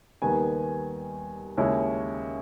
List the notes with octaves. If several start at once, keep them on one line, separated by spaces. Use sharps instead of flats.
D#2 D#3 G3 B3 G#5
D#2 C#3 G#3 C#4 E4